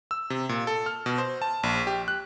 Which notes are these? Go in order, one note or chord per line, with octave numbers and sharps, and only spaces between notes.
E6
C3
A#2
A4
F6
B2
C5
A5
A#1
G4
F#6